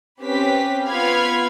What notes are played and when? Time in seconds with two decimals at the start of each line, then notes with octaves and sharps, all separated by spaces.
0.22 C4 C#4 G4 B4 B6
0.87 B3 F4 F5 B5 F6 G#6